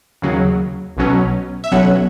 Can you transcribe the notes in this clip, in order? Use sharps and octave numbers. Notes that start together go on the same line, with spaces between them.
D#2 C#3 F#3
B1 B2 F#3 C#4
E5
B1 B2 F#3 C#4 F#5